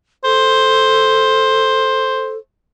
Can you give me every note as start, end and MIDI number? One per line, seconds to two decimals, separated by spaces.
0.24 2.37 69
0.24 2.37 72